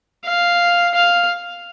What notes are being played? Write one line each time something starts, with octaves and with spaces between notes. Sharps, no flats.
F5
F5